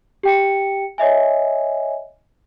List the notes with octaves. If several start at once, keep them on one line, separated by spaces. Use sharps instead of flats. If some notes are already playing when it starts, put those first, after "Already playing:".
G4 G5 C#7
C#5 D#5 E5 G#5